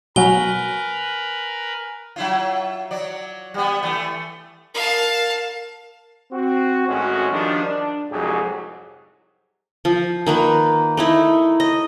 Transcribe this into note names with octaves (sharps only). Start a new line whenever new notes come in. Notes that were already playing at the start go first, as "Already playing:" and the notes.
B2 F#3 A#4 B4 G#5 G7
F#3 E4 F4
F#3 D5
G3 B3
E3 A3
A#4 F5 A5
C4 F#4
G#1 A2 G#3 C#4 F#4
D#3 F3 G3 D4
D4
C2 F2 G#2 F#3 G4 G#4
F3
D#3 A#3 B4
A3 D#4 E4
D#5